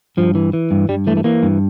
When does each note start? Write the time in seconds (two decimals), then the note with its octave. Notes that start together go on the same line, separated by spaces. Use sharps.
0.17 G2 F3
0.35 E3
0.53 E3
0.71 G2
0.89 G2 G3
1.07 E3 A3
1.17 A3
1.24 E3 A#3
1.43 G2